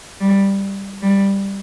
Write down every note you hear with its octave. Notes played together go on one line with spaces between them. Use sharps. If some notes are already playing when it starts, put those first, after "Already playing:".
G3
G3